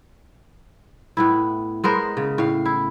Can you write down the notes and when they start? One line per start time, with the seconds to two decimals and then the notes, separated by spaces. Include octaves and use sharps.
1.17 A2 B3 E4
1.84 G#3 B3 A#4 C5
2.17 C#3
2.38 A2 F5
2.66 E4